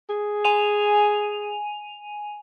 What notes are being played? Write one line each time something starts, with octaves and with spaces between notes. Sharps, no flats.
G#4
G#5 D#7 F7